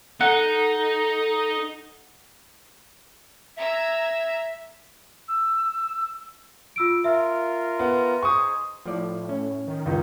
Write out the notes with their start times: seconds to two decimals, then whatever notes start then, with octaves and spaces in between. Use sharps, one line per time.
0.21 D#4 A4 F#5
3.57 E5 A#5 E6 G#6
5.27 E6
6.76 F4 E6 D7
7.04 F4 A#4 E5
7.79 B3
8.23 D#4 G#4 C5 C#6 D#6
8.86 A2 F3 D5
9.29 C#4
9.67 D#3
9.86 C#2 D#4